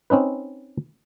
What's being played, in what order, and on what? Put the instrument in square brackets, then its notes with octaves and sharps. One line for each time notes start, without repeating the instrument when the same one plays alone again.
[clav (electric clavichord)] C4 C#4 D#4 B4